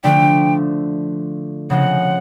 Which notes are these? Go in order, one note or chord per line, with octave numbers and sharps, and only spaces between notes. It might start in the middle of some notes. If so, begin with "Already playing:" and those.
D3 F3 A3 D4 G5
C#3 F3 G#3 C4 F#5